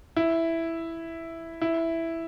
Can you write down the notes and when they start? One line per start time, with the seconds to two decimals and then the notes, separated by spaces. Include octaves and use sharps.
0.16 E4
1.61 E4